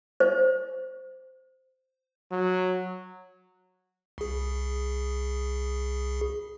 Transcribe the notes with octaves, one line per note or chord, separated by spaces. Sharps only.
C5
F#3
C2 G#4